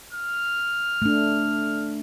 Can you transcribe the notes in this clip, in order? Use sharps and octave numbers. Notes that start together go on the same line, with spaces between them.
F6
A3 D4